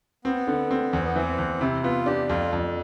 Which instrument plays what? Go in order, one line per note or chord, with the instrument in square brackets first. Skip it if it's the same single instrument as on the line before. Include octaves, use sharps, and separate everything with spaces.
[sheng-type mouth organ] B3 [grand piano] C4
[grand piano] D3
C4
[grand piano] E2 [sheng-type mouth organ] C4
[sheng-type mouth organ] B3
[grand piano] E3 [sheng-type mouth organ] C4
[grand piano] E2
[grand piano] C3 [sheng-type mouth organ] E4
[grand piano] B3 [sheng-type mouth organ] F4
[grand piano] D4 [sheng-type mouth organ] G4
[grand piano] F2 [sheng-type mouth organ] F4
[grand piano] F2